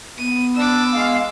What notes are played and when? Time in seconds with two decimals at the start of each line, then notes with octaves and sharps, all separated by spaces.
0.18 B3 D#7
0.55 D4 D6 E6
0.94 G#3 F5